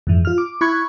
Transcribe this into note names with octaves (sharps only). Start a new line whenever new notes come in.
F2 G#2 E3
F4 F6
D6
E4 B5 C#6 F#6 G#6